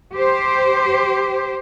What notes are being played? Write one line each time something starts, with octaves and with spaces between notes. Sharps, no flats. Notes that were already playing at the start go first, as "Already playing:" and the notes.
G4 C5